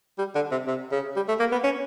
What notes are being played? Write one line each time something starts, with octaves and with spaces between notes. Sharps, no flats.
G3
D3
C3
C3
C#3
G3
A3
A#3
B3
C#4